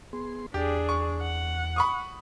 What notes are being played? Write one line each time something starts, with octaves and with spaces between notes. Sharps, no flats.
B3 G#4 C6
E2 D4 G4 G#4
C#6
F#5
B5 C#6 D#6